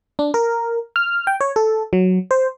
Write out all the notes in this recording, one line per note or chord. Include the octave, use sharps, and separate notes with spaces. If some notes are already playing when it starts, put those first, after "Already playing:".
D4
A#4
F6
G5
C#5
A4
F#3
C5